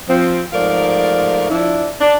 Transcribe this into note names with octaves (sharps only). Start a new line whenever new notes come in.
F3 C4
G#2 F3 A3 A#4 D5 F5
F3 D4 E4
D4